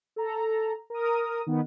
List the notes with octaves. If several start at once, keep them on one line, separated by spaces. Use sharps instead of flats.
A4 A#5
A#4 D#6
D#3 B3